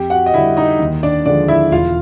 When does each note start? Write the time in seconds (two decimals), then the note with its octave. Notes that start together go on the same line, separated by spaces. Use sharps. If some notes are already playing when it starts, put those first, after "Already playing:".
Already playing: F2 G4 G5
0.10 F#4 F#5
0.26 D#5
0.34 D3 G3 E4 E5
0.57 D#4 D#5
0.79 D#2
1.03 D4 D5
1.26 D3 F3 G#3 D4 D5
1.48 E4 E5
1.72 E1 F4 F5